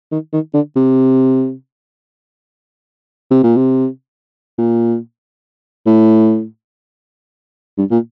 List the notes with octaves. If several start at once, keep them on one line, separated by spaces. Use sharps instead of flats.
D#3
D#3
D3
C3
C3
A#2
C3
A#2
A2
G2
A#2